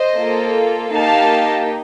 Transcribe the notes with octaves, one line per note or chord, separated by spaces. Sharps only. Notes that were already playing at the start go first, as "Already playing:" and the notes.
Already playing: C5 D#5
A#3 F4 A4
A#3 D#4 G4 F5 A5